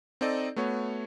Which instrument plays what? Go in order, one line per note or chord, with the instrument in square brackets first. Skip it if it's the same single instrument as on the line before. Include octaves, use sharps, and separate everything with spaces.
[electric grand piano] C4 D#4 A4 D5 D#5
A3 B3 F#4 C#5